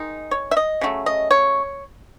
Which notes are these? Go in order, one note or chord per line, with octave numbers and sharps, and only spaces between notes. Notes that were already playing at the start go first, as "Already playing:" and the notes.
Already playing: D#3 G#3 D#4
C#5
E5
D#5
C#3 F#3 A3
D#5
C#5